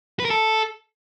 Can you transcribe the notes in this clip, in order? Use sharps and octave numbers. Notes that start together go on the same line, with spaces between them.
B4
A#4
A4